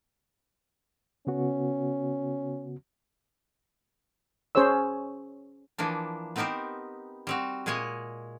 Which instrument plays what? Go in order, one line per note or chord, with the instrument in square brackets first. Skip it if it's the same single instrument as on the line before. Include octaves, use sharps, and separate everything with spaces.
[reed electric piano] C#3 B3 F#4 [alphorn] C#4
[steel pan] C#4 G#4 C5 C#5 E6
[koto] E3 F3 A#3 D4
B3 C4 D#4 G4 A#4 C5
G3 C4 F#4
A#2 G#3 G#4 C#5 D#5 G#5